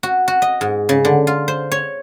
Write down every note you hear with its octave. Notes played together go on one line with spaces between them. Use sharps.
F#4
F#4
D#5
G#2
C#3
D3
F4
C5
C#5